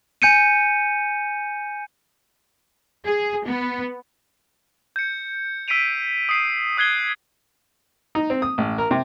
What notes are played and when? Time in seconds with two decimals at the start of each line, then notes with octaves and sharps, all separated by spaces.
0.22 G#5 G6 C#7 D#7
3.06 G#4
3.46 B3
4.96 G6 C#7
5.68 E6 B6 C7 D7 D#7 F7
6.29 D#6 C7 D#7
6.77 D#6 F#6 G#6 C7 G7
8.15 D#4
8.30 C4
8.42 D#6
8.58 A1
8.78 A#4
8.91 C3